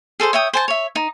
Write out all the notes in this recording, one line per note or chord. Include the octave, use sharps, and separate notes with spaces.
G#4 A4 C5 C6
C#5 E5 G5 D#6
C5 G#5 A5
C#5 E5
D#4